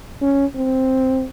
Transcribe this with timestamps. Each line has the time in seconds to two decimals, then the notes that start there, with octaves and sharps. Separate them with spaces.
0.22 C#4
0.56 C4